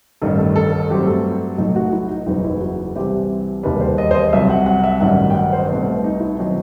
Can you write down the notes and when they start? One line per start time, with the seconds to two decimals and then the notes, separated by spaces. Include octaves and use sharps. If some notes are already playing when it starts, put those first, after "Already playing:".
0.22 A1 G2 D#3 A4
0.38 A4
0.56 A4
0.90 G2 F#3 A3 C4 G4
1.07 A4
1.58 B1 A2 F#3 A3 D#4
1.76 F#4
1.93 E4
2.10 D#4
2.26 F#1 E2 B2 F#3 B3 D#4
2.45 E4
2.61 F#4
2.95 C2 C3 E3 G3 C4 G4
3.63 E1 D#2 D#3 G3 B4
3.81 C5
3.98 D#5
4.11 C5
4.15 D#5
4.33 C2 C3 F#3 E5
4.50 F#5
4.66 F#5
4.84 E5
5.01 A1 G2 D#3 F#3 F#5
5.30 G5
5.35 F#5
5.53 C5
5.69 C2 B2 A3 C5
6.04 D#4
6.20 E4
6.38 D#3 F#3 C4 D#4